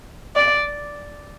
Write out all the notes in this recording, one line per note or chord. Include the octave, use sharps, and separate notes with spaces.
D5